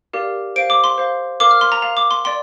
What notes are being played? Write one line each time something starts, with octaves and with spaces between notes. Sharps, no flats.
G4 A#4 D5 F5
C5 F5 D7
D6
C6
C5 F5
A#4 F5 D6
F6
C6
A#5
A#4 F5 A#5
D6
C6
D5 G5 C6